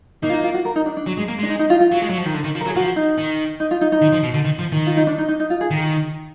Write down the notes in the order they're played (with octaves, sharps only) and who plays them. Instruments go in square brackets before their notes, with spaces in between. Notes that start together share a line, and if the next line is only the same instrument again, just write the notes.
[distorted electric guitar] A#3 [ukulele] D#4
[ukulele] F4
D#4
F4
F#4
A#4
D#4
D4
D4
[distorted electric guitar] F#3
G#3
A#3
[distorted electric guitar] G#3 [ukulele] D4
[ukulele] D#4
D#4
F4
F4
[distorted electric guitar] F#3
G#3
F#3
F3
D#3
D3
D#3
F3
[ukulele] A#4
[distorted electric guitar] F#3
[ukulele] G#4
[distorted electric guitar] F3 [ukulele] F#4
[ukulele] D#4
[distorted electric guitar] D#3
[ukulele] D#4
F4
D#4
D#4
[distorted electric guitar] D#3
F3
B2
D3
D#3
F3
D#3
[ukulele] F4
D#4
D4
D#4
D#4
D#4
F4
G#4
[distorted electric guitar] D#3